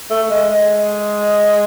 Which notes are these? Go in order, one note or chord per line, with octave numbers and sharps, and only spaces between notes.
A3
G#3
G#3